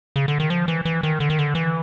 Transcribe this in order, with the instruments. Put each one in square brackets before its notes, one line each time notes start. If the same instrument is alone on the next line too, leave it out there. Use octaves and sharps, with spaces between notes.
[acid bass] C#3
D3
D#3
F3
E3
E3
D#3
D3
D#3
D3
E3